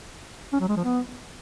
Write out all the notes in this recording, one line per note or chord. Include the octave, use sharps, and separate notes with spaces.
C#4
F#3
G#3
F3
B3